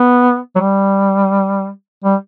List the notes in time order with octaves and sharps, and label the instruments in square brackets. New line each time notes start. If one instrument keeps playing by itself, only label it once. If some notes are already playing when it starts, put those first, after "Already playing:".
Already playing: [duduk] B3
F#3
G3
G3